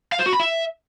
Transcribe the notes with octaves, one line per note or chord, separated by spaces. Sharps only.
F5
C5
F#4
B5
E5